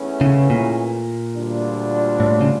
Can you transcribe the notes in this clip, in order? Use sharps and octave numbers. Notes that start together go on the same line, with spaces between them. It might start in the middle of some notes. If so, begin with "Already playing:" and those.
Already playing: E2 E3 A3 C#4 E4
C#3
A#2
D2 D3 G3 D4 F4
A2
C#3